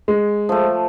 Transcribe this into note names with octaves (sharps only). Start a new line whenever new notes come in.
G#3
F3 A3